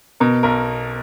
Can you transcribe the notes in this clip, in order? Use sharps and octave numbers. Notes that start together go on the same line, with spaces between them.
B2 A#4
B1 A#4